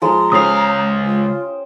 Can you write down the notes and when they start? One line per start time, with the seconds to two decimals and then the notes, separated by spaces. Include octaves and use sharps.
0.02 F3 G#3 A#5 C6
0.32 C#2 C#4 G4 C5 F5 D#6
1.06 F4